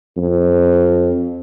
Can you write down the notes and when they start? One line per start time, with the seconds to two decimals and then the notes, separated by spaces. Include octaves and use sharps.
0.17 F2